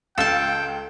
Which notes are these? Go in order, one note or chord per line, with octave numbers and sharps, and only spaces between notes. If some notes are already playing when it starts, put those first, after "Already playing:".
C#2 A4 F5 G5 A5